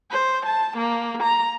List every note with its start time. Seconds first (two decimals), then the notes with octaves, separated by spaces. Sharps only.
0.11 C5
0.46 A5
0.77 A#3
1.23 A#5